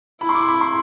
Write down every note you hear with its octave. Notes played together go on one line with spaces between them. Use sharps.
E4 B5
C6
D6
B5
C6